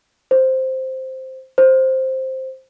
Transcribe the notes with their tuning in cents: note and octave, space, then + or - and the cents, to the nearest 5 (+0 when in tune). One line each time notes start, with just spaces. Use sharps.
C5 +0
C5 +5